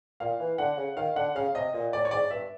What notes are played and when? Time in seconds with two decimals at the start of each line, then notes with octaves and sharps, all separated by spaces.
0.20 A#2 F5
0.40 E3
0.58 D3 F#5
0.77 C#3
0.97 D#3 F5
1.16 D3 F#5
1.35 C#3 F5
1.54 C3 D#5
1.73 A#2 D#5
1.93 A2 D5
2.05 C#5
2.11 G#2 D5
2.31 G2 E5